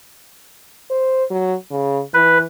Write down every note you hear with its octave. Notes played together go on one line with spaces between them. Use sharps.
C5
F#3
C#3
E3 B4